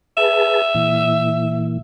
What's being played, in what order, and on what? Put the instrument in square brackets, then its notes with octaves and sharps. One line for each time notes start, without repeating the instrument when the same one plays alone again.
[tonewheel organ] G#4 B4 A5 [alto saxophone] E5
[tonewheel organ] A#2 E3